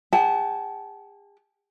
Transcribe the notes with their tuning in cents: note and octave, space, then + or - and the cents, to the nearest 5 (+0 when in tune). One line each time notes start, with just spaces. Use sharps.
G#4 -45 F#5 +40 A5 -20